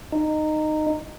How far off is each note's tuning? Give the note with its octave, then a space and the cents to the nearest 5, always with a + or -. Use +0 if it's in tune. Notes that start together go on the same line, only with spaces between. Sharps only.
D#4 -15